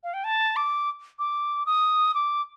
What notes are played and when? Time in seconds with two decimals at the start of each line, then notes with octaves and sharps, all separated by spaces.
0.04 F5
0.14 G5
0.24 A5
0.56 D6
1.19 D6
1.66 D#6
2.15 D6